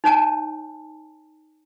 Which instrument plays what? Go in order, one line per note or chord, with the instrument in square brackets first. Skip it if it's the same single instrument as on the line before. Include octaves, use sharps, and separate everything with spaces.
[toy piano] D#4 C#5 G#5 A5